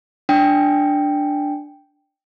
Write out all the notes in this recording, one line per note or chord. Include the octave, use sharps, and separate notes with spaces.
D4 G5